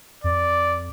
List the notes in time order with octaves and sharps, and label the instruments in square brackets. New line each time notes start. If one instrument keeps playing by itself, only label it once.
[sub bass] F2 [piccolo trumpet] D5